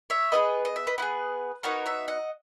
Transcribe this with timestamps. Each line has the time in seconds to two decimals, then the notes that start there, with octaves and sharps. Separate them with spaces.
0.10 C#5 E5
0.32 B3 E4 G#4 B4 D#5
0.65 D#5
0.76 E5
0.87 B4 D#5
0.98 B3 E4 B4
1.02 G#4
1.63 B3 D#4 F#4 A#4 C#5
1.86 C#5 E5
2.08 D#5 F#5